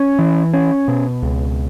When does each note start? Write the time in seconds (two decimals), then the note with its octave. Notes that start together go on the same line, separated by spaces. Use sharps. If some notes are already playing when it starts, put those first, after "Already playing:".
Already playing: C#4
0.19 E3
0.53 C#4
0.88 B2
1.23 C#2